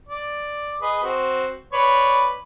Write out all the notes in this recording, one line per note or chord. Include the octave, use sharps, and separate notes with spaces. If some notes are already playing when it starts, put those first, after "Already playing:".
D5
G#4 B4 D#5
C4 F#4
B4 C#5 D5